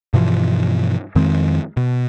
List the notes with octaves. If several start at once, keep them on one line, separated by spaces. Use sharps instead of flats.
G2 B2 E3 F3
F2 D#3 G#3 C4
B2